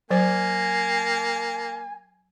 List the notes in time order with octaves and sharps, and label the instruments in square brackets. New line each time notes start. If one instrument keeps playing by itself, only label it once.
[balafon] F#3 C5 [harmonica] A#3 [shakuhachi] G#5